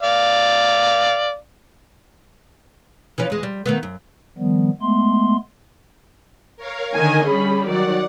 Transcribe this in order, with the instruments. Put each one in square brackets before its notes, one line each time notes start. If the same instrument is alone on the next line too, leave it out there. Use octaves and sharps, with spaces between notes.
[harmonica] D5 F5
[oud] E3 F3 C#4
E2 G#3
G3
D#3 A3 B3
F#2
[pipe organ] D#3 F3 G3 B3
G#3 A3 B3 C6
[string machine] A#4 C#5 F5
[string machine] D3 D#5 [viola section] D#3 G#5
[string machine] G3 [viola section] C#4 G#4 B5
[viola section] D#3 F#3 D5 [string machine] F#5